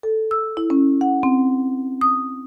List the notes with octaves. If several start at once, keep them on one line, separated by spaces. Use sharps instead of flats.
A4
E6
E4
C#4
F#5
C4
D#6